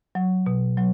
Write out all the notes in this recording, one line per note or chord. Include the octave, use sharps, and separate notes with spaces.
F#3
B2
F#3